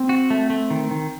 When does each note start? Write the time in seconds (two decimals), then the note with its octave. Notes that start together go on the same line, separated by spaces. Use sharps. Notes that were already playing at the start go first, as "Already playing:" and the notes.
Already playing: C4
0.09 F#4
0.30 A3
0.50 A3
0.70 D#3
0.91 D#3